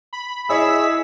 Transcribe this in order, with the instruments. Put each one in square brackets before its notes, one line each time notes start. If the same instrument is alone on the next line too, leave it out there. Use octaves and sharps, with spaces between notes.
[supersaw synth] B5
[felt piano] E4 C#5 D#5 [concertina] G#4 [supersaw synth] E6 B6